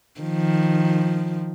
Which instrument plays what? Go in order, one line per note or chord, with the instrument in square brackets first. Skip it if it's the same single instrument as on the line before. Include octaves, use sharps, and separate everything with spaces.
[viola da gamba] D#3 F3